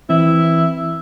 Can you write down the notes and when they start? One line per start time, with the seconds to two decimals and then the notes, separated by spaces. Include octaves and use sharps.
0.09 E3 C4 E4